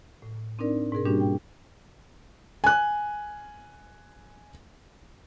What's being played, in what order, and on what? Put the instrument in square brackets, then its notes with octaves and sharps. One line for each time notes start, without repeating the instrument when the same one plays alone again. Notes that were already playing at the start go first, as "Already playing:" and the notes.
[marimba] A2
C4 D4 D#4 A#4 D5
G#2 B2 G#4 A#4
G3 A#3 C#4 D4 F#4 G4
G5
[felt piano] G#5 F#6